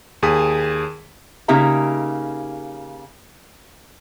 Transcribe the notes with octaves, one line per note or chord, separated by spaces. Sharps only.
D#2 G#4 D#6 B6
C#3 A#3 D#4 G4 E5 A#5